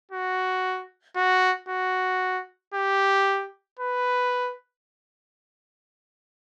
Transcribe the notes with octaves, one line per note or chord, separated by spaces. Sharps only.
F#4
F#4
F#4
G4
B4